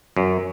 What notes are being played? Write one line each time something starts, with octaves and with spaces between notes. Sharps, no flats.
F#2